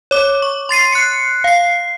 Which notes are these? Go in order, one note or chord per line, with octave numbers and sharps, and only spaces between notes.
C#5 D6
C#6
C6 A6 C7 D#7
F#6 C7 C#7
F5 C7